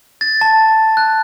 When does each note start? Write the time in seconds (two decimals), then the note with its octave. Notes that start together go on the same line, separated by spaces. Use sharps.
0.21 A6
0.41 A5
0.97 F#6